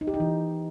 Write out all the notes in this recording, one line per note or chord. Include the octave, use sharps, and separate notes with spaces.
D#4
G4
D#4
E3